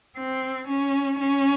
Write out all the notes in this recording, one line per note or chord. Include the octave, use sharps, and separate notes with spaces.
C4
C#4
C#4